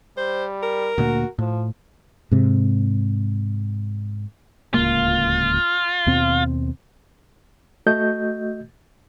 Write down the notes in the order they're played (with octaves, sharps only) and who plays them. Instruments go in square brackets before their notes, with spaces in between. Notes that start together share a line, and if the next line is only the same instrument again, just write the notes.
[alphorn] G3 [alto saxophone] C5
[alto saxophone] A#4
[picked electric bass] D2 A#2 A#3 [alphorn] F#4
[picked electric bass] A2 [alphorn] F3
[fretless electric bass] G#2 C3
[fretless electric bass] D1 C#2 A#3 [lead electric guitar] F4
[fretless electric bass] D#2 B2 C4
[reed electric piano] A3 F#4 D#5 G6